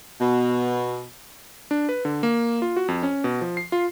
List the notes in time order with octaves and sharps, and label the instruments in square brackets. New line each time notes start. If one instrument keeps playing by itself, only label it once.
[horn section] B2
[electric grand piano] D4
B4
D3
A#3
F4
F#4
F2
C#4
B2
F3
C7
F4